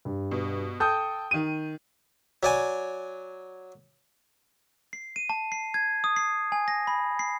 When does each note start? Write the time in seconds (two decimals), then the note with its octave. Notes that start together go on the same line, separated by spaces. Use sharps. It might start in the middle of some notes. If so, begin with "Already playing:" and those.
0.05 G2
0.31 B2
0.80 A4 G5 D#6 G6
1.31 D#3 D#7
2.43 F#3 D5 G#5
4.93 C7
5.16 D#7
5.29 A5
5.52 C7
5.74 G#6
6.04 D#6
6.16 C7
6.52 G#5
6.68 A#6
6.87 B5
7.19 C7